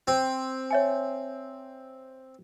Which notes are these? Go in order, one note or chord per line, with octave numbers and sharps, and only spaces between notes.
C4
C#5 E5 G#5